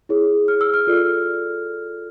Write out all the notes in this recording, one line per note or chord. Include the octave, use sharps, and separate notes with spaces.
E4 G#4 C#5
F6
E6
F6
F4 A4 D5